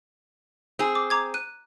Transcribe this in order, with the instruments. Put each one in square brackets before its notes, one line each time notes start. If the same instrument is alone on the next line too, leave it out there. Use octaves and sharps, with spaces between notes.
[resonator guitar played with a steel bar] C4 G#4
[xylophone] D6
A#5 D6 G#6
F#6 D#7